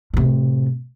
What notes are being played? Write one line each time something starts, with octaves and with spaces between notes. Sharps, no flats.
A2 C3